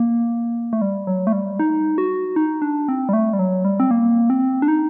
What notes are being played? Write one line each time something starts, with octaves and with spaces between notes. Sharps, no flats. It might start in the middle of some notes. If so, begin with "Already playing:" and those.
Already playing: A#3
A3
G3
F#3
A3
G3
D#4
F#4
D#4
D4
C4
G3
A3
G3
F#3
G3
C4
A#3
C4
D4
D#4